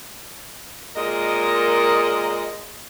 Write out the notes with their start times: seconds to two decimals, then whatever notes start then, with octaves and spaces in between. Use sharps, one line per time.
0.96 A#2 G#3 A#4 D#5